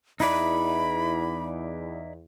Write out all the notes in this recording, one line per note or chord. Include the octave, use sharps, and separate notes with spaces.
E2 D#4 E4 D5 B5